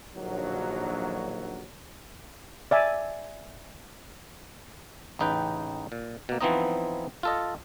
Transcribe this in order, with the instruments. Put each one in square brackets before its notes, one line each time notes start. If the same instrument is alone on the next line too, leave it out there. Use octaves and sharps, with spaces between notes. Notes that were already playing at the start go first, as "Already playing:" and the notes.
[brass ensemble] A#1 D#2 D3 F#3
[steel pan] D5 E5 G#5
[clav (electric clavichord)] A1 C#3 D#4 B4 G5
A#2
B2 A#3
E3 F3 B3 C4 D#4 D#5
F4 A4 D#5